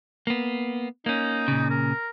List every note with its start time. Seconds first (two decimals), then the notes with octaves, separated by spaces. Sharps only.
0.27 A#3 B3
1.06 A#3 C#4 D#4
1.48 A#2 C#3
1.70 A#4